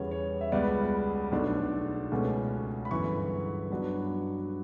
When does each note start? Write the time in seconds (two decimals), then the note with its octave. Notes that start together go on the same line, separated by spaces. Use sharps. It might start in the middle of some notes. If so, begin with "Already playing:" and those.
Already playing: E2 C#3 G3 C#5
0.11 C#5
0.41 E5
0.52 C#2 C#3 G3 B3 D5
1.32 B1 B2 A3 D4
2.12 C#2 B2 A3 C#4
2.85 B5
2.91 G1 F#2 E3 C#6
3.70 G2 F#3 B3 D4